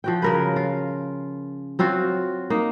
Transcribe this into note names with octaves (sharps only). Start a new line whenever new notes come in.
F3 F#4 G5
C#3 A#4 B4
F4
F#3 C4 F4 F#4
A#3 D#4